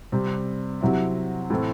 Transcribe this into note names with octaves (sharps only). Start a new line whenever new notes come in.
C3 G3 C4
C3 F#3 C4 E4
A2 E3 A3 C4